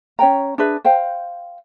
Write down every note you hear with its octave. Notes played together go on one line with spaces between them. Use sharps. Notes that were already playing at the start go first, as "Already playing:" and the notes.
C#4 C#5 G5 A#5
D4 G#4 B4 E5
C5 F5 G5